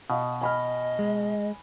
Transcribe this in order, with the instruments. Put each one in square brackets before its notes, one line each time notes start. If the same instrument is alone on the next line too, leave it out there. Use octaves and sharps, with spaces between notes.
[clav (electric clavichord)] B2 [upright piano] D#5 F5
[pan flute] D#5 [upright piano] G#5 B5 F6
[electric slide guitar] G#3